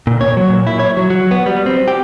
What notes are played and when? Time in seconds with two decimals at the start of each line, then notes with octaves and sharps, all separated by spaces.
0.07 A#2
0.21 C#5
0.37 F#3
0.50 A#2
0.67 E4
0.80 C#5
0.97 F#3
1.10 F#3
1.31 B3
1.46 G3
1.66 C4
1.88 G4